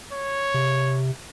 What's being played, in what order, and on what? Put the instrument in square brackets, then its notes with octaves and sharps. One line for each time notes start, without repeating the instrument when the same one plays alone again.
[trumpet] C#5
[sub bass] C3